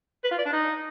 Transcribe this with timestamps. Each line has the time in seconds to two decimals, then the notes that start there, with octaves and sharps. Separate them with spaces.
0.24 B4
0.31 F4
0.38 D5
0.46 D4
0.53 D#4